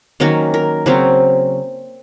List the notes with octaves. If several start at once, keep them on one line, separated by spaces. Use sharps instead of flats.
D#3 F#3 A#3 C#4 F#4
A#4
C#3 F#3 C4 F#4